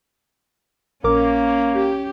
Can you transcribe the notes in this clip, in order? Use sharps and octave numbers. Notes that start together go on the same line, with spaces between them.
A#1 A#3 C#4 A#4 D6
G4